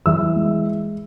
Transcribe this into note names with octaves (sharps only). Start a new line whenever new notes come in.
E3 E5 E6
G#3